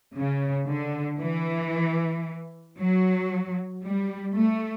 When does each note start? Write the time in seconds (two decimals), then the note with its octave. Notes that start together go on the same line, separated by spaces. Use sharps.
0.16 C#3
0.68 D3
1.20 E3
2.78 F#3
3.83 G3
4.35 A3